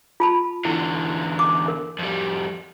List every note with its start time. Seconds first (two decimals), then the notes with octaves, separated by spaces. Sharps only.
0.20 F4 A5 B5
0.65 E2 D3 E4
1.39 D6
1.68 A#4
1.99 F2 G3